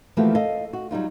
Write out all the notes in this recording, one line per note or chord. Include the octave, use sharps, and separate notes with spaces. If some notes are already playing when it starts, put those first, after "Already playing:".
E3 F3 A3 A#3 F#4 G4
A4 D#5 F5
F#4
F#3 G3 D#4 F4